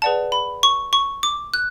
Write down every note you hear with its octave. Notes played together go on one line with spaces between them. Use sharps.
G#4 B4 D5 F#5 A5
B5
C#6
C#6
D6
F#6